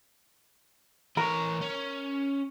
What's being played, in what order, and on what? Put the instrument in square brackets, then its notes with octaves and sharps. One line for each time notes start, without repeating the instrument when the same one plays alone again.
[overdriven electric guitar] E3 C#5 [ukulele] A#4
[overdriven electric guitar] C#4